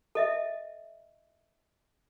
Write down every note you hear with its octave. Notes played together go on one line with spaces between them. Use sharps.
A4 D#5 E5